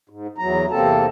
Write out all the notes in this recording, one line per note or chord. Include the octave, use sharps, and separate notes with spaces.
G#2
E2 F#3 A#5
E2 C3 A#3 C4 A4 A5